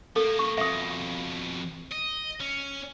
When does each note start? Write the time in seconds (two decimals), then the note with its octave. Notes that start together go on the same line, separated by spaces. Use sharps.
0.16 A3 A#3 A4
0.39 C#6
0.58 F2 B2 E5 D#6
1.91 D#5
2.40 C#4